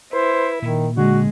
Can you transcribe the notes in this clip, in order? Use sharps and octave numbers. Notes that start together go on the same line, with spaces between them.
E4 B4 C5
A#2 D#3
D3 G#3 F#4